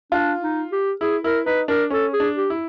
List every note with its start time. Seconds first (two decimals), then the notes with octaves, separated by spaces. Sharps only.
0.12 D4 F4
0.42 D#4
0.72 G4
1.01 E4 G#4
1.24 E4 A#4
1.46 D#4 B4
1.68 D4 A#4
1.90 C#4 A4
2.13 G#4
2.20 D4
2.35 G4
2.50 E4